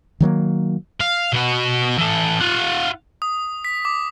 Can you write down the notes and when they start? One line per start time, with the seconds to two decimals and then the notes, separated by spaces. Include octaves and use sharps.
0.20 D#3 F#3 A3 A#3
1.01 F5
1.33 B2 F#4
1.98 E3 A4
2.41 F4 F#5
3.22 D#6
3.65 B6
3.85 D6